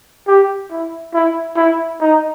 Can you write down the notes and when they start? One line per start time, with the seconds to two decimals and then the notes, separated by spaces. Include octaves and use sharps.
0.27 G4
0.71 E4
1.14 E4
1.56 E4
2.01 D#4